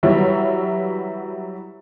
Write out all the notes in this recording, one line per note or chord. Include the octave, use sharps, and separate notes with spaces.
E3 F#3 G3 E4 C#5